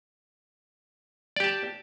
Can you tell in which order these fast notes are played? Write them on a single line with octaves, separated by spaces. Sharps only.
D5 G4 A5